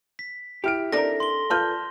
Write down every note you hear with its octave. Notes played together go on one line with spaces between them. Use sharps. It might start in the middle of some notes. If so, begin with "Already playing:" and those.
B6
E4 G4 F6 D7
C4 D4 D#4 A4 A#4 A#6
C6 G7
F4 B4 D5 A5 F6 G6